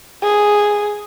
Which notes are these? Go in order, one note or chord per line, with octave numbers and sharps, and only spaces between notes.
G#4